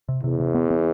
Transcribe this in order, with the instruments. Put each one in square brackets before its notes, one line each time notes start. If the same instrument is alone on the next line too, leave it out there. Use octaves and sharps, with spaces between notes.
[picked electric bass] C3
[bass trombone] E2 [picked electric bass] C3
[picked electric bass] C3
B3
B3